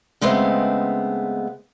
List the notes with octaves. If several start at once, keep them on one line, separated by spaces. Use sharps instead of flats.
C#3 G#3 A3 B3 C4